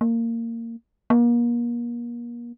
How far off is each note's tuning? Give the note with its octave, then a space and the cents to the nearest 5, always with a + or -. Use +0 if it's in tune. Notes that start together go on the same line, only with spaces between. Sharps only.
A#3 -20
A#3 +35